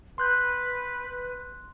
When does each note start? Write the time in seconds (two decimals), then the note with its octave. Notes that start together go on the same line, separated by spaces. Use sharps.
0.18 B4 C6 F#6 G6